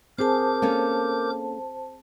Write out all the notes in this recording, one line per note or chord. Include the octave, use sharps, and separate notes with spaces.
C4 G#4 A#4 C5 A5 D6 G6
A#3 C#4 A4